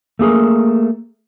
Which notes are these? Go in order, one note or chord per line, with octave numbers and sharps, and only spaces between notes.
A3 A#3 G#4 A#4